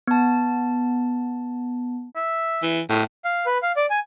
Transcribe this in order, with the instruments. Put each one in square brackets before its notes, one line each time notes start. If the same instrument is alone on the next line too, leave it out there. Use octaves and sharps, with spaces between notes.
[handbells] B3 A5
[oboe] E5
[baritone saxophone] E3
A2
[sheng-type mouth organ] F5
B4
F5
D5
G#5